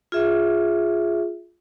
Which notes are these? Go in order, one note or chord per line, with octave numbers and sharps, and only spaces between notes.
F4 G#4 E5